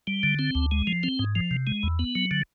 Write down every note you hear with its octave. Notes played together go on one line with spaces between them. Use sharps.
G3
D3
C4
D2
G#3
F3
C4
G#2
F3
C3
G#3
E2
B3
F#3
D3